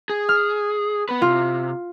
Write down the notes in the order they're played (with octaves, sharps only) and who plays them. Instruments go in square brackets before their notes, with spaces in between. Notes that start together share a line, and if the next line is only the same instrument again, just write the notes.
[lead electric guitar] G#4
[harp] F6
[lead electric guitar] B3 B4
[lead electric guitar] C3 [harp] F4